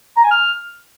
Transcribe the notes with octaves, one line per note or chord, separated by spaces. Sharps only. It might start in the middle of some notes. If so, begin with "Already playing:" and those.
A#5
G#5
F6